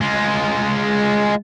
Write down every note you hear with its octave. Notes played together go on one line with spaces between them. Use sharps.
G#3 F4